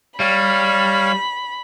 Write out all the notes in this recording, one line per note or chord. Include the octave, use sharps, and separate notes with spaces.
G3 C#5 F5 B5